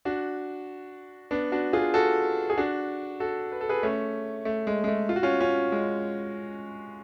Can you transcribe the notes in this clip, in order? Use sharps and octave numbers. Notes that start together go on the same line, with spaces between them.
D4 F#4
B3 D4
D4 F#4
F4 G#4
F#4 A4
G#4
D4 F#4
F#4 A4
B4
A4
G#4 B4
A3 C#4
A3
G#3
G#3
A3
F4
F#4
C#4 F4
C#4 F4
G#3